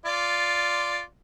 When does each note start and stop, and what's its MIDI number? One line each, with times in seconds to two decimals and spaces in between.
0.05 1.01 65
0.05 1.01 74